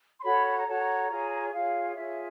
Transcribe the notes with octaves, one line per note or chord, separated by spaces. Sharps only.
C6
F#4 A4 C#5 B5
B5
A#5
F#4 A4 C#5 A5
A#5
F4 G#4 C#5
F4 G#4 C#5 F5
F4 G#4 C#5 E5